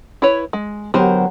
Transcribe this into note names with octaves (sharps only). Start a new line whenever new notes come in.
E4 B4 C#5
G#3
D3 F#3 B3 G4 A#4 C5